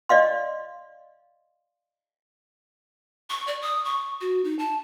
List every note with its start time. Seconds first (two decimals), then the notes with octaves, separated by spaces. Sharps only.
0.09 D5 D#5 F5 C6
3.30 C#6
3.47 D5
3.62 D#6
3.85 C#6
4.21 F#4
4.44 D#4
4.59 A5